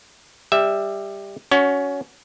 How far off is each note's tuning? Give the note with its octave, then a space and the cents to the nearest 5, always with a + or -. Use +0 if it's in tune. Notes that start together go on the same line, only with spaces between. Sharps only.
G3 +15 E5 +0
C#4 +20 F#4 +0